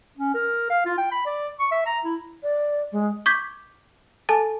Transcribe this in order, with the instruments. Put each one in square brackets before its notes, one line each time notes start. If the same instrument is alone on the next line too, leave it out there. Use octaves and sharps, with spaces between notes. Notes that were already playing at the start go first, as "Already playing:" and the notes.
[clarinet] C#4
A#4
F5
F4
G5
B5
D5
C#6
E5
A#5
E4
[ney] D5
G#3
[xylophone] C#6 D6 G6 G#6 B6
A4 G#5 A5 A6